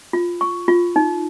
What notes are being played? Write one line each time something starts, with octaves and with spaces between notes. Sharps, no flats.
F4
C#6
F4
D#4